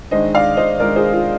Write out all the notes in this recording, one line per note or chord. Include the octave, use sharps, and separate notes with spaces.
D#3 G#3 D4 C5 D#5
D5 F5
C5 D#5
D#3 G#3 D4 A#4 D5
G#4 C5
F4 G#4